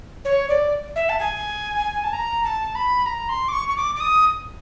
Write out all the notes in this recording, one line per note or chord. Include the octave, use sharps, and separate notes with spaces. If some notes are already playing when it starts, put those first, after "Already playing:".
C#5
D5
E5
A5
G#5
A5
A#5
A5
B5
A#5
C6
D6
C#6
C#6
D6
D6
D#6